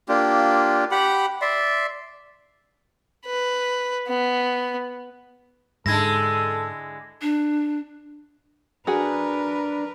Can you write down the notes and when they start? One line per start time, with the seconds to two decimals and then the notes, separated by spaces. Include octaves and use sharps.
0.09 A#3 D4 F4 G4
0.91 G4 F#5 B5
1.41 D5 E5 C6
3.26 B4
4.08 B3
5.86 G#2 D3 G#3 E4 A4 G#6 A#6
7.22 D4
8.87 D4 F#4 G#4 A#4 B4